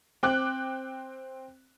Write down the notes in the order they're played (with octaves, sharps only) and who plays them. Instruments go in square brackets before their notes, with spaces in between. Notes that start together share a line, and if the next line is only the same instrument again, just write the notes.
[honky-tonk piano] C4 G5 D6 F#6